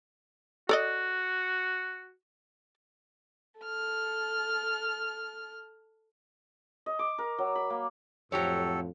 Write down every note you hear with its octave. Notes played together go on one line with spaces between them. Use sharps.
F#4 A4 D5 D#5
A4 F6
D#5
D6
A#4
F#3
B5
A#3
F2 A2 F3 F#3 G4 A4 C#5